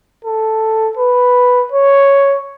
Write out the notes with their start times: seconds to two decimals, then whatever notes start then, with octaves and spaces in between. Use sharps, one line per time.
0.25 A4
0.97 B4
1.72 C#5